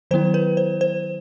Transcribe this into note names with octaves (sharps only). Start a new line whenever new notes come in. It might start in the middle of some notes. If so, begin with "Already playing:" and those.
D#3 F#3 B3 E4 C5
B4
C5
C5